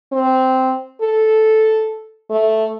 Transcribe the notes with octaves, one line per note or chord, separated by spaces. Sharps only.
C4
A4
A3